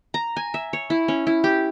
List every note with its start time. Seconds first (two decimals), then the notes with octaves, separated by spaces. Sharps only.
0.14 A#5
0.37 G#5
0.54 E5
0.73 C#5
0.90 E4
1.08 C#4
1.27 E4
1.44 G4